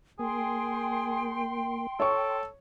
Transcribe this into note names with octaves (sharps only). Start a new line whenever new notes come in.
A#3 G#4 G5 C6
A4 C#5 C#6